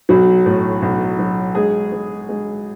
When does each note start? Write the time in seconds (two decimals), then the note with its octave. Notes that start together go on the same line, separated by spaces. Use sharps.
0.09 B1 F#3 F#4
0.46 A2
0.82 B1
1.19 F#3
1.55 G#3 G#4
1.92 G#3
2.29 G#3